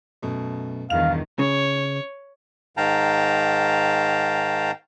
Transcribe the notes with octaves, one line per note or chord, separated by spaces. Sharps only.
F#2 B2 A3
E2 G2 B2 D#3 F5 F7
C#3 C#5
G#2 D#3 F5 G5 A5 A#5